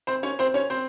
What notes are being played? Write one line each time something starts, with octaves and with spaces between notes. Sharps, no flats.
C4 C5
C#4 C#5
C4 C5
C#4 C#5
C4 C5